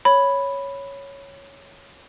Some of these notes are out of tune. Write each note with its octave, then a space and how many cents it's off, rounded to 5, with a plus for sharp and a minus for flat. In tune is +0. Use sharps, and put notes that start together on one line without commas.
C#5 +0 B5 +0